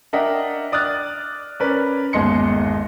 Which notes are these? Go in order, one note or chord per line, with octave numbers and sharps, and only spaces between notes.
D4 A#4 D#5 E5 F#5 G5
D5 D#6 F6 F#6 A6
C#4 A#4 B4 D5
G1 D#2 G#3 D#5 C6 C#7